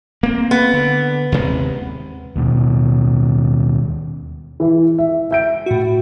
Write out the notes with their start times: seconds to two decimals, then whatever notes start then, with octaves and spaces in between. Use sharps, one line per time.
0.23 A#3 C4
0.51 B3
0.74 D3
1.32 D#2 C3 G#3
2.36 D#2 B2
4.60 E3 E4
4.99 E5
5.31 E5 G6 D7
5.66 A2 F#4